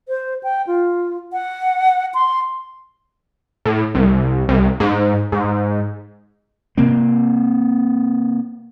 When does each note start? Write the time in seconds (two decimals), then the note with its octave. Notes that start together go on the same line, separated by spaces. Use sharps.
0.08 C5
0.43 G5
0.67 F4
1.33 F#5
2.14 C6
3.65 A2
3.95 C2
4.49 C2
4.80 G#2
5.32 G#2
6.78 C3 A#3 C4